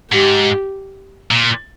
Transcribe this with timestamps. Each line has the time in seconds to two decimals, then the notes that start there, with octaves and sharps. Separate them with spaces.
0.11 G#2 G4
1.31 A#2